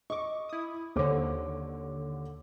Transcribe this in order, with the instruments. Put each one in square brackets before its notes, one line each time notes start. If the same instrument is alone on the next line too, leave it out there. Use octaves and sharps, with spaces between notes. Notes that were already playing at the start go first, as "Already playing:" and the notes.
[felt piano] D#5 [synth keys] C#6 D6
[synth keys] E4 D#6
[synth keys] D#2 D3 [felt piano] C5 C#5 D6